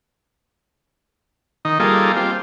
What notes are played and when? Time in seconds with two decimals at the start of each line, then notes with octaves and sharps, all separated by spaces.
1.65 D#3 D#4
1.80 G3 A#3 D#4 F4 G#4 A4
2.16 C4 F4 G4